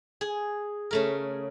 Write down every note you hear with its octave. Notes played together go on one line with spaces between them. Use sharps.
G#4
C#3 A3 A#4